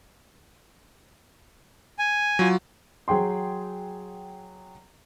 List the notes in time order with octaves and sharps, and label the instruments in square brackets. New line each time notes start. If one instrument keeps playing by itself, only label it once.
[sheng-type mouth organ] G#5
[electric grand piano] F#3 F4
[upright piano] F#3 G#4 G5 C6